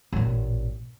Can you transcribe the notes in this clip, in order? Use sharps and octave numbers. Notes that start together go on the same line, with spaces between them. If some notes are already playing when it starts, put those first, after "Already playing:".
A1 A#2